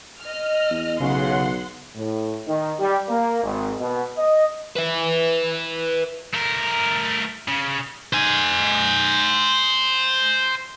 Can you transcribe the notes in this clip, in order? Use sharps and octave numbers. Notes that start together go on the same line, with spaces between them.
D#5 F6
E2
B1 C#3 F#5 C6
A2
D#3
G3
A#3
G#1
B2
D#5
B4 E5
A3 A#4
C#3
C5 G#5